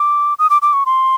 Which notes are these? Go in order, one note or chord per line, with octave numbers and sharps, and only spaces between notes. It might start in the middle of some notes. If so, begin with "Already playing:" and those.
Already playing: D6
D#6
D6
D6
C#6
C6